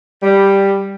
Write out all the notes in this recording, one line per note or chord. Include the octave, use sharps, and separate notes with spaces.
G3